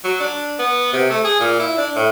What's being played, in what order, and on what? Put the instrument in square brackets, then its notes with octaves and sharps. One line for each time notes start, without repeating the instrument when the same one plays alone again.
[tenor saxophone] F#3
D4
B3
C3
A3
G#4
A#2
E4
D4
A2